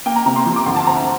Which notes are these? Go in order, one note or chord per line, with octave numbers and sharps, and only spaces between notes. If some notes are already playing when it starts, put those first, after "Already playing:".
A#3 G5
A#5
C3 A#5
C6
F3
D6
D2 C6
A5
C4 A#5